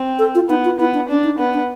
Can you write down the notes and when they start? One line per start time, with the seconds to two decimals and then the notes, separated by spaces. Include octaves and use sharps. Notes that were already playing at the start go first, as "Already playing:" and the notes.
Already playing: C4
0.19 A4
0.35 F4
0.49 B3 D#4
0.65 F4
0.79 B3 E4
0.94 D4
1.09 C#4 D4
1.24 D#4
1.39 B3 D4
1.54 D4